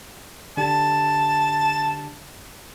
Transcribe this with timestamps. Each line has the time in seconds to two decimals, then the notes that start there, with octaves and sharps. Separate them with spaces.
0.57 D3 D4 G4 A5